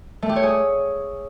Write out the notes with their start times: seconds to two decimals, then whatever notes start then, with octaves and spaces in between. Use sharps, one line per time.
0.22 A3
0.29 G4
0.36 C#5
0.43 G#4